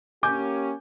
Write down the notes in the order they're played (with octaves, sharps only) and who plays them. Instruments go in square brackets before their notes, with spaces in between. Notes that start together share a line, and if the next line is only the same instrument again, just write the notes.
[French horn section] A#3 C#4 G4 [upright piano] G#5 D6 G6